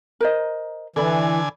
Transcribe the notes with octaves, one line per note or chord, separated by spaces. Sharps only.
A#4 C5 D#5
D3 E3 A4 D5 G#5 B5